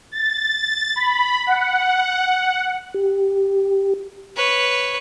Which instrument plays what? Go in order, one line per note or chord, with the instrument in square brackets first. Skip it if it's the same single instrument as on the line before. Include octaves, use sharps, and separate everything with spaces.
[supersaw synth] A6
B5
F#5
[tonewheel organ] G4
[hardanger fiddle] B4 C#5